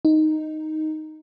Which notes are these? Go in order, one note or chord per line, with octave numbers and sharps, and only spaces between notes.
D#4